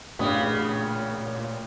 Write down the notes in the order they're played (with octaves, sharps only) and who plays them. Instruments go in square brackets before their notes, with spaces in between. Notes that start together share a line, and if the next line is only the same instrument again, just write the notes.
[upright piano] A1 D4 D#6 [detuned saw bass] A#2 [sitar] C#3 B3